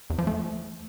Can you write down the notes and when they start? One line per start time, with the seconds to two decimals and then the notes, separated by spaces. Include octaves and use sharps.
0.10 E2
0.18 F3
0.27 A3